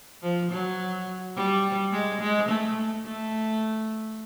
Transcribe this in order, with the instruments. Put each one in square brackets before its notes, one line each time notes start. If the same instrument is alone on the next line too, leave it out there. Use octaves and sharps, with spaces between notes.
[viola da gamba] F3
F#3
G3
G#3
G#3
A3
A3